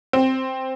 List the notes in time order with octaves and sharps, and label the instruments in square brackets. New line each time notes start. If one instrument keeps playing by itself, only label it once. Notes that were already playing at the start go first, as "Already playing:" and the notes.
[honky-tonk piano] C4